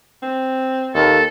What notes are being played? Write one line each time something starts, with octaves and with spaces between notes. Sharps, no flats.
C4
D#2 A4